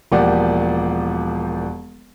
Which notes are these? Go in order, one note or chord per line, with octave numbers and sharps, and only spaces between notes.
E1 F3 A#3 G4 D5 F#5